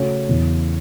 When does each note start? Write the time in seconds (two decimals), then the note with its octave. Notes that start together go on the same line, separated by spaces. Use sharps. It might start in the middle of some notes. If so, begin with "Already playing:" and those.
Already playing: C#3 A3 C#4 F#4 C#5
0.29 E2 C#3 E3